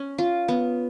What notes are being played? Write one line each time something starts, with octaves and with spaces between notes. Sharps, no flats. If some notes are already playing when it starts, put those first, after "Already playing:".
Already playing: C#4
F4
B3